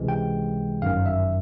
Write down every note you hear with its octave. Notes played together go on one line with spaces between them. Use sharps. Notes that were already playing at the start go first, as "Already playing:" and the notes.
Already playing: C#2 C3 E3 G#3
G5
G1 F#2 D#3 F#3 F5
E5